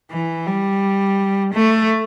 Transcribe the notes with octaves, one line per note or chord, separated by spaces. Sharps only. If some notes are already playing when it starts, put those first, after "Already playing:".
E3
G3
A3